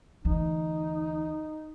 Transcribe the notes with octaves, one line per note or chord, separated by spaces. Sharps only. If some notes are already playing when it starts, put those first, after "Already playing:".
D2 E3 D#4